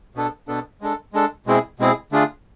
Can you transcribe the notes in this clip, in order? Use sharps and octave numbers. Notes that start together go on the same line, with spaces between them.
B2 B3 D4 A4
B2 B3 D4 A4
G#3 D4 A4
G#3 D4 A4
B2 G#3 C4 E4 G#4
B2 G#3 C4 E4 G#4
D3 A3 D4 F4 G#4